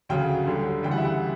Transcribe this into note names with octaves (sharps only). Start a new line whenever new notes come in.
D2 C#3 F#3 G5
D2 D3 G3
D2 C#3 E3 G3 G5
F#5
E5
F#5